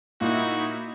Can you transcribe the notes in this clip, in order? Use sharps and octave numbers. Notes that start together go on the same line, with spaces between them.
A#2 D#4 E4 F#4